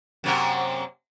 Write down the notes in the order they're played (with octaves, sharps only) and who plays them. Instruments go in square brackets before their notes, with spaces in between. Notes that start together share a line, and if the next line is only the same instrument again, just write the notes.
[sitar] F#2 C3 A#3